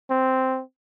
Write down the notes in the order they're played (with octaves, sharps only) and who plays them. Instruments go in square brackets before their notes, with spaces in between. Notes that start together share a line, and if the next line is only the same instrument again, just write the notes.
[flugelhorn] C4